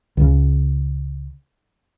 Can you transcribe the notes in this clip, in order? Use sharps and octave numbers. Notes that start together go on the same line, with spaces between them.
C#2 C#3